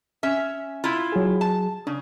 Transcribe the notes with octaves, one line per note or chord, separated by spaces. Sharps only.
C#4 E5
E4 F4
F#3 G#4
A5
C#3 D4